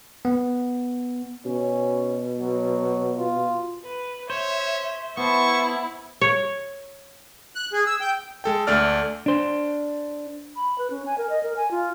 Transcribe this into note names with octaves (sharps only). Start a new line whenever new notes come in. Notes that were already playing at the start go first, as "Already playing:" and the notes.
B3
B2 C#4
F#3
F4
B4
C5 C#5 E5
B3 E4 C5 A5 C#6
C#5
F#6
G#4
E6
G5
G#3 A4 G5
D2 A3 D5 F6
D4 C5
B5
B4
C#4
G#5
A#4
D#5
A#4
G#5
F4